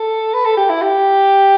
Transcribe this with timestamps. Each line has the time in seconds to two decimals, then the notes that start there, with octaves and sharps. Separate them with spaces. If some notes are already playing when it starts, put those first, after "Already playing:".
Already playing: A4
0.34 B4
0.45 A4
0.57 G4
0.70 E4
0.82 G4